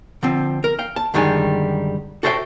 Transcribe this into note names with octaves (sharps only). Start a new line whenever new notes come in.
D3 F3 C4
A#4
F5 G5
A5
F#2 D3 D#3 G3 G#3 G#5
F#4 A4 C5 E5 F#5 G5